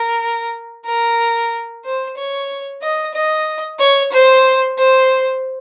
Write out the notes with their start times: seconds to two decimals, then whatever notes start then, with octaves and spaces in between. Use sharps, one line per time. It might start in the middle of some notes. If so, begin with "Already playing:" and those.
Already playing: A#4
0.85 A#4
1.85 C5
2.17 C#5
2.82 D#5
3.14 D#5
3.80 C#5
4.12 C5
4.78 C5